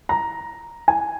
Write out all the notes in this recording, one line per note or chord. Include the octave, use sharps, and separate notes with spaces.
A#5
G#5